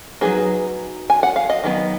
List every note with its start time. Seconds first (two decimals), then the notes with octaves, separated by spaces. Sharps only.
0.21 F#3 B3 D#4 G#4 B4
1.10 G#5
1.23 F#5
1.36 F5
1.50 D#5
1.64 D#3 F#3 B3